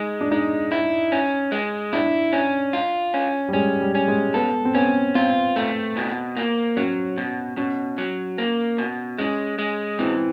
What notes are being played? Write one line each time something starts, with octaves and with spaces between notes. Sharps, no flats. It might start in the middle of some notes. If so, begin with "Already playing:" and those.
Already playing: G#3 D#4
D4
G#3 D#4
E4
C#4
G#3
D4 E4
C#4
F4
C#4
G3
G#3 C#4
G3
C#4
G#3
B3 A4
C4
B3 C#4
C4 F4
A3
B2
A#3
F#3 C#4
B2
B2 C#4
F#3
A#3
B2
G#3 C#4
G#3
E3 C4